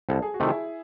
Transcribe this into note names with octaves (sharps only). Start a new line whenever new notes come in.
C2 A4
G#4
F#4
C3 D#3 A3
E4 G#4